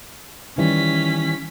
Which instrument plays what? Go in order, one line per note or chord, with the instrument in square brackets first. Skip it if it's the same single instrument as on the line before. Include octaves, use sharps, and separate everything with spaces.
[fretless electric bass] D#3 E3 G3 [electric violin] C#4 B6